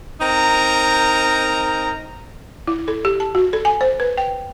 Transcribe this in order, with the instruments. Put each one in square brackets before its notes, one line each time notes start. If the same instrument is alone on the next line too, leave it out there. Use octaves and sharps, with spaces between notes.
[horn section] C4 D#4 A#4 A#5
[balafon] E4
A4
G4
A5
F#4
A4
G#5
C5
B4
G5